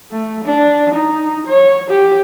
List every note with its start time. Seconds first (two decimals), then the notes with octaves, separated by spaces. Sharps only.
0.12 A3
0.44 D4
0.94 D#4
1.47 C#5
1.90 G4